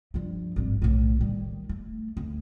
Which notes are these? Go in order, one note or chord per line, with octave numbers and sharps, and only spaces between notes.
G2 F3
G#1 G2
B1 A2
D#3 G3
A3
D2